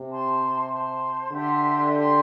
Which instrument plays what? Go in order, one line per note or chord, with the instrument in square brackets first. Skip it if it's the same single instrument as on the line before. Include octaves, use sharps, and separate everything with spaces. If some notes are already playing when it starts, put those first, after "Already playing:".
Already playing: [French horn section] C3
[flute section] C5 A5 C6
C5 A5 C6
[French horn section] D3 [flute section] G4 E5 C6
[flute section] G4 E5 C6